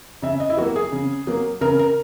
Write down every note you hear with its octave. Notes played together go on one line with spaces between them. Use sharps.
C#3 E5
D#5
E4
F#3 A#3 F#4
G#4
C#3
F#3 A#3
C#3 A#4
A#4